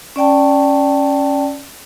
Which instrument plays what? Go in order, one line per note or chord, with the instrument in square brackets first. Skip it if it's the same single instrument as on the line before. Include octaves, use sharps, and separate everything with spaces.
[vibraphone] C#4 D5 G5 A5